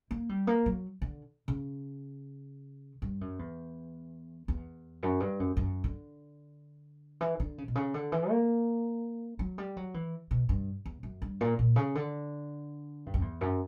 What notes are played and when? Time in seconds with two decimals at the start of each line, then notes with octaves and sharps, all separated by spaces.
0.11 A#3
0.29 G3
0.47 A#3
0.66 F#3
1.02 D3
1.48 C#3
3.02 G2
3.21 F#2
3.39 E2
4.48 E2
5.03 F#2
5.20 G2
5.40 F#2
5.57 F#2
5.84 D3
7.21 E3
7.40 D3
7.58 C#3
7.68 B2
7.75 C#3
7.94 D3
8.12 E3
8.30 A#3
9.39 F#3
9.58 G3
9.77 F#3
9.94 E3
10.31 B2
10.49 G2
10.85 E2
11.03 F#2
11.22 G2
11.41 A#2
11.59 A#2
11.76 C#3
11.95 D3
13.06 G2
13.14 F#2
13.22 E2
13.41 F#2